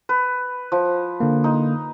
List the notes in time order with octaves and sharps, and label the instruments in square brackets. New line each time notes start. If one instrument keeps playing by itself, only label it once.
[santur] B4
F3
[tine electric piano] D3 A#3
[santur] D#4